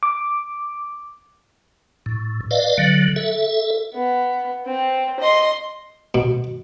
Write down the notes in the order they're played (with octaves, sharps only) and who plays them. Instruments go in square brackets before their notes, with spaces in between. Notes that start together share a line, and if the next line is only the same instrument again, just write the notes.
[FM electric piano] D6
[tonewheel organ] A2
B4 D5 D#5 F5
D3 F#3
A4 E5
[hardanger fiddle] B3
C4
D#5 C6
[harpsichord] B2